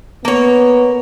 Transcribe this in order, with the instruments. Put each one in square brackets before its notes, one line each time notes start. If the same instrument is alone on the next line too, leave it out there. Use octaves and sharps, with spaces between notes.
[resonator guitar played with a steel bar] A#3 C#5 [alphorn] B3